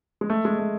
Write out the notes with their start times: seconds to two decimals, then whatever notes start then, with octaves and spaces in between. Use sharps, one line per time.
0.21 G#3
0.30 A3
0.45 G#3
0.59 A3